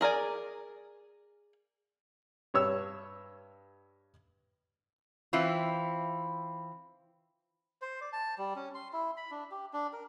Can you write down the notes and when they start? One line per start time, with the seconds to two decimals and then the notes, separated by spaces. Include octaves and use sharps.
0.01 G#4 A#4 D5 G#5
2.54 G2 C#5 E6
5.33 E3 C4 E4 F4
7.82 C5
8.01 D5
8.13 A5
8.38 G3
8.56 C#4
8.74 C6
8.93 E4
9.17 B5
9.31 D4
9.51 G4
9.73 D4
9.93 A#4